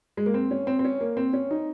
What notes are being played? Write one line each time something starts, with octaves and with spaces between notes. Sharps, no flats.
G#3
A#3
C4
C#4
C4
C4
C#4
A#3
C4
C#4
D#4